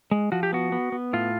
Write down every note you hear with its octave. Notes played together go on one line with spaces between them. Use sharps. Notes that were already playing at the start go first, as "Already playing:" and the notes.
G#3
F3 F#4
G4
B3 F#4
B3
B3
A2 F4